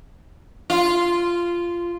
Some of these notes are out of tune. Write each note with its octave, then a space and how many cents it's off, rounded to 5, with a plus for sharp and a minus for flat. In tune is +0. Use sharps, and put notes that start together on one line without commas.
F4 -10